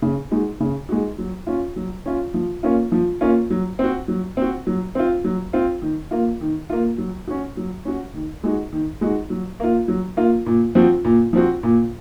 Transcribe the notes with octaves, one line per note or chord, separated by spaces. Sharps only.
C#3
G#3 D#4 F#4
C#3
G#3 D#4 F#4
F#3
C#4 F4
F#3
C#4 F4
F3
A#3 C#4 F4
F3
A#3 C#4 F4
F#3
C4 F#4
F#3
C4 F#4
F#3
C4 F4
F#3
C4 F4
D#3
A#3 F4
D#3
A#3 F4
F#3
C#4 F#4
F#3
C#4 F#4
D#3
G#3 D#4 F#4
D#3
G#3 D#4 F#4
F#3
A#3 F4
F#3
A#3 F4
A#2
F3 C4 F#4
A#2
F3 C4 F#4
A#2